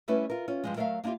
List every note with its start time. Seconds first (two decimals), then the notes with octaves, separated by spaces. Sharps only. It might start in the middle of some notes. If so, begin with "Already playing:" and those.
0.08 G3 A3 C#4 E4 B4
0.30 F4 A#4
0.48 C#4 F4
0.64 G2 F3 G#3
0.76 F#3 A3 A#4 C#5 E5 F5
1.04 A#3 D4 E4 F4 G4